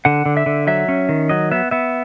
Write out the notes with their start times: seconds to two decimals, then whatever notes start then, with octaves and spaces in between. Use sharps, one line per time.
0.05 D3 F#5
0.26 D3
0.37 E5
0.46 D3
0.67 F#3 E5
0.88 C#4
1.09 D#3
1.29 F#3 D#5
1.51 B3 E5
1.71 B3 E5